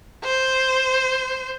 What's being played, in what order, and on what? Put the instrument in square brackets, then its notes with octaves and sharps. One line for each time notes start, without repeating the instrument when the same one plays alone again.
[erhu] C5